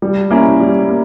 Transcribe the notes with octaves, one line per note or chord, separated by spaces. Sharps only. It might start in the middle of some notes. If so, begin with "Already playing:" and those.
G3
A#3 C#4 E4
G3
A#3